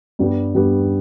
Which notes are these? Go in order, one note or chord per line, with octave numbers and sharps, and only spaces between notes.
G2 G3 B3 G4
G2 G3 B3 G4